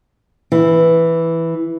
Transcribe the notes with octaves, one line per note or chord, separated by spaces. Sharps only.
E3